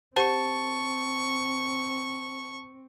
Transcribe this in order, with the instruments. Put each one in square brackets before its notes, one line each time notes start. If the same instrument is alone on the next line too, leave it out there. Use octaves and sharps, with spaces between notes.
[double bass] C4 [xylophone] G4 C5 F#5 [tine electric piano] A5 [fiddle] C#6